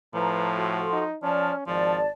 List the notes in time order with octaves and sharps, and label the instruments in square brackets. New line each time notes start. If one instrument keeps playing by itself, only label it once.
[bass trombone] A2 [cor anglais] F3 [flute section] B4 A#5
[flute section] F#4 A4 C6
[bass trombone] D#4
[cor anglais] F3 [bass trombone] C#4 [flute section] D5 A5 F6
[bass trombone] G#1 [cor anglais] F3 [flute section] D5 A5